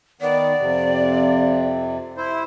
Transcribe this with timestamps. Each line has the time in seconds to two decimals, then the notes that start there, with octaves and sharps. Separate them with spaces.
0.21 D#3 B3 D5
0.60 F2 C3
2.17 E4 C5